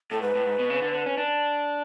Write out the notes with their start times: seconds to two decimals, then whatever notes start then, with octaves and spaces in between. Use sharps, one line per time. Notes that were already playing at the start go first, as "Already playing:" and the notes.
0.11 A2 A4
0.22 G#2 B4
0.35 A2
0.46 G#2
0.59 B2
0.70 C#3
0.82 D3
0.93 D3
1.06 C#4
1.18 D4